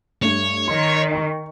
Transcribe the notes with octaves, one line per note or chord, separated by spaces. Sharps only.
G2 A3 C#5
D#3 C6
G5 C#6